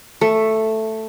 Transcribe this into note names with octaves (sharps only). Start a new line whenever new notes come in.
A3